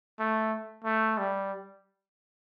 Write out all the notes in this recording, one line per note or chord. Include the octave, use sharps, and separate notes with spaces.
A3
A3
G3